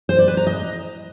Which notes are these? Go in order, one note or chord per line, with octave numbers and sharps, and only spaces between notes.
C5
D5
B4
A#5
D#5